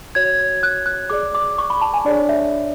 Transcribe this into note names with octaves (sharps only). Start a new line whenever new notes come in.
F#4 C#5 G#6
F#6
F#6
G#4 D5 D6
D6
C#6
B5
A5
G#5
D4 G#4 C#5 D5
E5